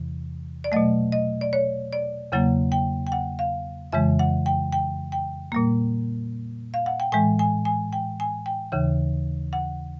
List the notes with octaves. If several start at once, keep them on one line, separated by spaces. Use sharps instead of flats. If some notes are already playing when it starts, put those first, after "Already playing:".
Already playing: E2 C3 E3
D5
B2 F#3 A3 D#5
D#5
D5
C#5
D5
E2 C#3 F#3 A#3 F#5
G5
G5
F#5
F5
F2 C#3 E3 G#3 E5
F#5
G5
G5
G5
A#2 G3 A#3
F5
F#5
G5
A2 E3 G#3 G#5
G#5
G#5
G5
G#5
G5
D#2 C#3 E3
F#5